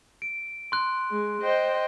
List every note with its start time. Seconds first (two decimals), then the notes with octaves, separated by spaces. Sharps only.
0.22 D7
0.72 C6 F#6
1.11 G#3
1.41 C5 D#5 G5